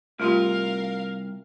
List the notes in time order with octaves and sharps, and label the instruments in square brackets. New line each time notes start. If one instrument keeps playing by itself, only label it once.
[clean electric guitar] C2 [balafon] A3 F4 G4 [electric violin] A#4 F5